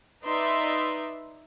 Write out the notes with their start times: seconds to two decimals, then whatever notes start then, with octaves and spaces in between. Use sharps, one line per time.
0.24 D#4 B4 D5 E5 C6